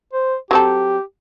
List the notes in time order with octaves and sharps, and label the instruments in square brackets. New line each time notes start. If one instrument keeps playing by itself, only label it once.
[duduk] C5
[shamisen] F#3 C4 A4 [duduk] G4